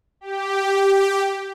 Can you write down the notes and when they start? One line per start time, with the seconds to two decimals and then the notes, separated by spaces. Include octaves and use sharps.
0.21 G4